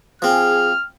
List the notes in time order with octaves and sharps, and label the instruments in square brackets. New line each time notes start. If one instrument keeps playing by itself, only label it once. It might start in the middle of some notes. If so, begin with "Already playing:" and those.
[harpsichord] F3 C4 [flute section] G#4 [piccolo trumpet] F6